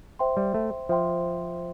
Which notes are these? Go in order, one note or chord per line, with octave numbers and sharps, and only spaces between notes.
C5 E5 G5 C6
G3
A3
F3 C5 E5 G5 C6